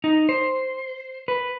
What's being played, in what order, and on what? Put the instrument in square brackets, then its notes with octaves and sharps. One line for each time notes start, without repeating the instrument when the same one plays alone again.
[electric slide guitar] D#4
C5
B4